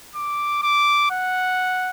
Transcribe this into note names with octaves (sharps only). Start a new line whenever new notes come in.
D6
D6
F#5